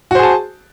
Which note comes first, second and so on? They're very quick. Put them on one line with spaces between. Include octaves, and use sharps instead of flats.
F#4 C5 G#4 A5